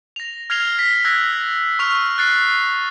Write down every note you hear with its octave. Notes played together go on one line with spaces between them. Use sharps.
A#6 F7
F6 G#6 A#6 C7 F7 G7
B6
E6 F#6 G#6 A#6 B6
C#6 E6 F6 F7
F#6 A6 C7